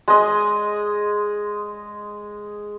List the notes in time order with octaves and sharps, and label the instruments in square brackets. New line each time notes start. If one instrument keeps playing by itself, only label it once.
[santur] G#3 D#5